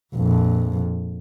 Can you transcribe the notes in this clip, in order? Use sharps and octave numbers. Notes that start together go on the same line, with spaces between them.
A#1 F2